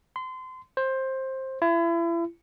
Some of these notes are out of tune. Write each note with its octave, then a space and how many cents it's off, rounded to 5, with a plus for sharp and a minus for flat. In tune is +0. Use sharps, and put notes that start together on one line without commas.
C6 -30
C5 +15
E4 +35